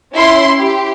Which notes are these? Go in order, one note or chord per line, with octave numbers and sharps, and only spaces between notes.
C#4 E4 C6
G4